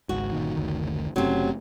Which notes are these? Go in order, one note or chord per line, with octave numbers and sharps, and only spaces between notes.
G#1 C#2 G#2 F#4
G1 A#2 D#3
F#1 D2 D#3
F#1 C3 F#3 A3 C#4